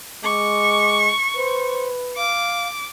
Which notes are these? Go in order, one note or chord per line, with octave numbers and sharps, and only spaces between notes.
G#3 C#6 D6
B4 C5
F5 D6